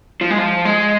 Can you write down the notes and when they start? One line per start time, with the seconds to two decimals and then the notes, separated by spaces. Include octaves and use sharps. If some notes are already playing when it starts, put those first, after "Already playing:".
0.21 F3
0.30 G#3
0.38 F3
0.65 G#3